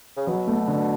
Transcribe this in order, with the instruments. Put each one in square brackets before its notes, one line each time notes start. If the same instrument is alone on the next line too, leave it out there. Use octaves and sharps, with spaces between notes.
[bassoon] C#3
[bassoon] B2 [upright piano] F#3
[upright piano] A3
D3